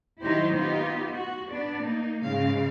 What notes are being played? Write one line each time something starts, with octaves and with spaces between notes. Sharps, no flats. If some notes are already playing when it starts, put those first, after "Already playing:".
D#3 F#3 D#4 E4 G4 C5
B3 D#4 F4 G4
F#4
B3 D4 D5
A#3 D#4
G#2 C#3 G#3 F5